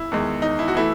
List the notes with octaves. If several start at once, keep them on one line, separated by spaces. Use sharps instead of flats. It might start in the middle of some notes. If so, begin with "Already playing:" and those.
Already playing: E4
E2 D#3 G#3
D#4
E4
F#4
E3 A3 E4